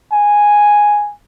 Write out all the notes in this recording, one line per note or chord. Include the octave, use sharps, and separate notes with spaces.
G#5